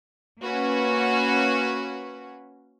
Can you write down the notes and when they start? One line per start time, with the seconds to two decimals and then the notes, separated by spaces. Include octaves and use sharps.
0.43 A#3 C#4 F#4 B4